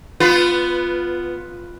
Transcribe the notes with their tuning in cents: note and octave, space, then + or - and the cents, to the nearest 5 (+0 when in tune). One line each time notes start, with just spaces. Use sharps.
B3 +0 F4 +0 B4 +20